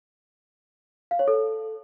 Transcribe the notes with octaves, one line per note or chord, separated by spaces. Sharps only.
F5
C#5
A4